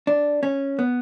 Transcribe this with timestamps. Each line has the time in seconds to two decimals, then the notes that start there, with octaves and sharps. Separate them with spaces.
0.07 D4
0.43 C#4
0.79 B3